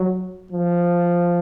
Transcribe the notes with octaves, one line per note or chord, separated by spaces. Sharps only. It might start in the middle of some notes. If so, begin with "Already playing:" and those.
Already playing: F#3
F3